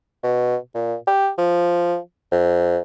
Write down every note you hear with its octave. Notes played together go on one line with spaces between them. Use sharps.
B2
A#2
G4
F3
F2